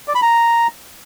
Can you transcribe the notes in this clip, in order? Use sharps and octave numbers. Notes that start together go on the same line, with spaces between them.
D5
B5
A#5